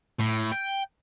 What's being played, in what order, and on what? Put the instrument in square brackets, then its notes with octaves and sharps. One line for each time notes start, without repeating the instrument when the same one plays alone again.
[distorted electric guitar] A2
G5